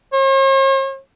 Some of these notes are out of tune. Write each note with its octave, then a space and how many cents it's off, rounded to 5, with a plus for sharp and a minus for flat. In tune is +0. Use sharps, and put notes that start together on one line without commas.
C#5 -45